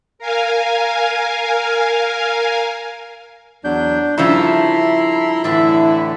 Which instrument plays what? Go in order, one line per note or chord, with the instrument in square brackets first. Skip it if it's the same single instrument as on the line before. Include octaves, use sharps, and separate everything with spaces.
[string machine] A#4 F5 G#5
[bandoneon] E2 F#3 G6 [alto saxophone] D4
[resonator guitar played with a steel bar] G2 C#3 F3 [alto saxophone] E4 [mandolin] A4 E5 [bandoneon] A#5 C6
[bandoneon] A2 D3 E3 [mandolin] D4 E5 [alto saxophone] E4